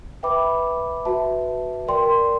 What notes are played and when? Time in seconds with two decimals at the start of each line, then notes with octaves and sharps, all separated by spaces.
0.23 B4 E5 G5 B5 D6
1.05 F#4 B4 E5 A5
1.88 A#4 D5 G5 C6